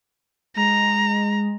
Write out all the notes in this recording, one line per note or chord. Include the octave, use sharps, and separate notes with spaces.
G#3 A#5